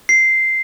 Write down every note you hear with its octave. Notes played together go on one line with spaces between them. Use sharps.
C7